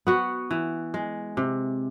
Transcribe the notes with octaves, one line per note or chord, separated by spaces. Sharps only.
B3 F#4
E3
G#3
C3